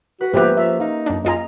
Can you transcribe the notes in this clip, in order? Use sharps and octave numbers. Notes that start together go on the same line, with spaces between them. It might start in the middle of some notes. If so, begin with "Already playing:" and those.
F#4 B4
G#2 F3 A#3 B3 C#4 G4 B4 E5
F3 E5
D#4 F5
F#2 D4
F#2 F4 G#4 D#5 A#5